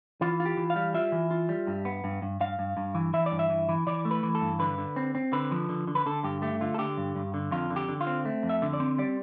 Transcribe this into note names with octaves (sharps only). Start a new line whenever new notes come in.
E3 F4
F4
G4
E3
F5
G3
F4 E5
E3
F4
G3
G2
B3
G2
G2
G2 F5
G2
G2
E3
E3 E5
D5
G2
E5
E3
E3
E3 D5
A3
B4
E3
A4
G2
D3 B4
D3
C4
C4
D3 B4
F3
D3
D3
B4
D3 A4
G2 G4
A3 G4
D3 F4
A4
D3 G4
G2
G2
D3
F2 F4
D3
G4
D3
F4
C4
A3
F2
E5
D3
D5
C4
G3 D5